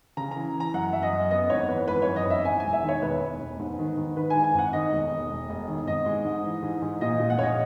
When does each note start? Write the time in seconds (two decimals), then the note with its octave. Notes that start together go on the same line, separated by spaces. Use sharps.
0.17 C#3 A#5
0.31 E3 A#5
0.56 E3 A#5
0.74 F#2 F#5
0.93 F#2 E5
1.03 D#5
1.13 F#2
1.31 B3 D#5
1.50 G#1 C#5
1.69 E3 B4
1.88 G#1 B4
2.02 F#2 C#5
2.16 D#5
2.26 G#1 E5
2.45 E2 G#5
2.60 E1 G#5
2.73 E5
2.83 D#3
2.89 C#5
3.02 E1 B4
3.21 E1
3.40 E1
3.59 G#2
3.79 D#3
3.97 G#2
4.16 D#3 B4
4.30 G#5
4.36 G#2
4.44 G#5
4.54 G#1 F#5
4.73 D#3 D#5
4.93 E1
5.11 E1
5.31 E1
5.50 E1
5.68 D#3
5.87 G#1 D#5
6.06 G#3
6.24 G#2
6.44 E3
6.62 G#2
6.82 G#2
7.01 A#2 D#5
7.20 A#2
7.30 F#5
7.39 A#1 C#5 D#5